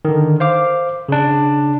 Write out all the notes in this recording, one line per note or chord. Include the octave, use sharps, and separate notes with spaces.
D3 D#3
C5 F5 D6
C#3 D4